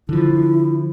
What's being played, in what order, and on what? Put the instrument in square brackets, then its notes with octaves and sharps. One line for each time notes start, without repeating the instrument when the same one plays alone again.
[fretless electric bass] D3 F3 [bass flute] E4